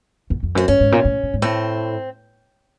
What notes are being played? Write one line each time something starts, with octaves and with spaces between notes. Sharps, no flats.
E2
F2
F#2 C4
G2 C#4
G#2
A#2
A2
A2
G#2
A2 C4